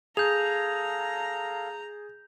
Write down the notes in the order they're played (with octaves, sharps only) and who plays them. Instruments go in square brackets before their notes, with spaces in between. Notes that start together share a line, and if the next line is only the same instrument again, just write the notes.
[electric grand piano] G#4 [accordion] A4 F5 [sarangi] A#5 [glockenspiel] G6 F7